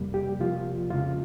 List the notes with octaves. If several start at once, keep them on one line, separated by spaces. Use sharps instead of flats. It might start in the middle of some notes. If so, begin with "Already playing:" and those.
Already playing: F2 C3 G3 A#3
G4
C3 F3 A#3 F4
F2 C#3 F3 G#3 F4